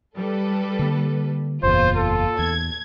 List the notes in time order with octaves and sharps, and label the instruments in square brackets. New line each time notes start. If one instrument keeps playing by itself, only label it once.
[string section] G3 A4 B4
[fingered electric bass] D3 A#3
[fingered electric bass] F#1 E2 [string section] A#2 F4 [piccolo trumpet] C5
[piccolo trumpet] A4
[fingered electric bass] E2 [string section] G#6